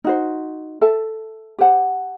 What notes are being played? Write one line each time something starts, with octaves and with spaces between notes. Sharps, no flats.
D#4 F#4 C5
A4 E5 A5
G4 C5 F#5 A5